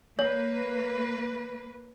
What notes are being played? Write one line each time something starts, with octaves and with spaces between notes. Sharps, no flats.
A#3 B4 C#5